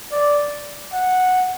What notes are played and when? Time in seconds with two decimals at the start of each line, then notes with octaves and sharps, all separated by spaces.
0.12 D5
0.92 F#5